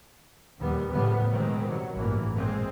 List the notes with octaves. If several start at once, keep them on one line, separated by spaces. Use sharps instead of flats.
A#1 D#2 G3 B3
A2 C#3 F3 G3 B3
B2 D#3 G#3 C4
G2 F#3
A1 G2 E3 A#3
A#2 G#3 C4